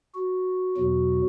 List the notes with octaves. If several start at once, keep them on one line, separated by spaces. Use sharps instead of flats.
F#4
E2 B2 F#3